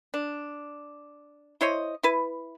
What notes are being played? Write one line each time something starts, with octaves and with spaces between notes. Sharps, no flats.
D4
E4 C5 C#5 D#5
E4 B4